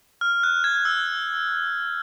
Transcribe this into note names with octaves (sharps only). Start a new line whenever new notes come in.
F6
F#6
G#6
E6